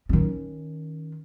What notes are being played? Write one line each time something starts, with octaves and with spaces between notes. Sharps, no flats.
D#3 C#4